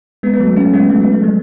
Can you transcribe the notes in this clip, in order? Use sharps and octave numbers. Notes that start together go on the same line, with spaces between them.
G#3 B3
B3
F#3 A3
A3 C#4
G#3 B3
F#3 A3
B3
A3
F3 G#3